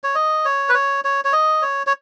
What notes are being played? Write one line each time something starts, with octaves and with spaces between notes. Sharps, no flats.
C#5
D#5
C#5
B4
C#5
C#5
C#5
D#5
C#5
C#5